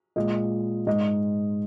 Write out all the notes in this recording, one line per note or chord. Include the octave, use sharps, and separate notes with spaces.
A#2 G#3 D#5
G#2 G#3 D#5